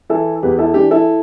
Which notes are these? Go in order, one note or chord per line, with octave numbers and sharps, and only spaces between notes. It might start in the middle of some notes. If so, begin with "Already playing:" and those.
E3 E4 A4
E2 G4 B4
E4 A4
E3 D4 G4
E4 A4